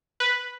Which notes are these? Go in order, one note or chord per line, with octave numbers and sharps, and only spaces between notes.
B4